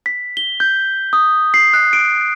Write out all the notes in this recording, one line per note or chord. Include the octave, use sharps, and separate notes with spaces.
B6
G7
G6
D#6
C7
F#6
D7